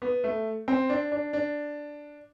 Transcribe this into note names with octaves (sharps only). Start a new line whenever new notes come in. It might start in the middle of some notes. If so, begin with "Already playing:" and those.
B3
A3
C4
D4
D4
D4